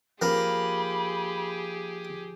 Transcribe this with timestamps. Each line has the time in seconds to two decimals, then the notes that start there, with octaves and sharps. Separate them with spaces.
0.22 F3 A#3 G4 G#4 B5